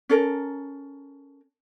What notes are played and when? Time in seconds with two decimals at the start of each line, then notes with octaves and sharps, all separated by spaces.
0.09 C#4 A4 A#4